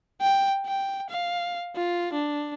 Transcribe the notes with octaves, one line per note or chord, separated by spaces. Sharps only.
G5
G5
F5
F4
D4